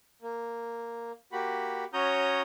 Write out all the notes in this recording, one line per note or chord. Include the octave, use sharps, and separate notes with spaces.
A#3
A#3 F#4 G4 B5
C#4 F#4 C#5 A#5 D#6 G6